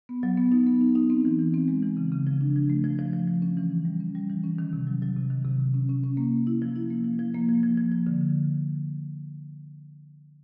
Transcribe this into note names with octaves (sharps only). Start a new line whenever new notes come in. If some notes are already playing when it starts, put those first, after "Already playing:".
B3
F#3
B3
D#4
B3
D#4
D#4
C4
E3
E3
C4
G#3
E3
C#3
C#3
F3
D4
F3
A3
F3
F3
F3
F3
C#4
E3
E3
G3
C#4
G3
E3
C#4
D#3
C3
F#3
F#3
C3
D#3
C3
C3
C#4
C#4
C#4
A#3
A#3
E4
F3
E4
A#3
F3
F3
A#3
F3
F3
F3
F3
D3
D3